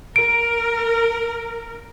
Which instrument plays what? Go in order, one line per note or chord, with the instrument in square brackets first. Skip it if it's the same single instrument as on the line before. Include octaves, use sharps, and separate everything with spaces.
[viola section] A#4 [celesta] D7